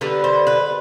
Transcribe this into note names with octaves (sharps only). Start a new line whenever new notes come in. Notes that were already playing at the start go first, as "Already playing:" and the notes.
D3 G3 B3 B4
C5
B4